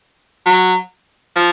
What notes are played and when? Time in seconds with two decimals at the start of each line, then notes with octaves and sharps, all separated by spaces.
0.46 F#3
1.36 F3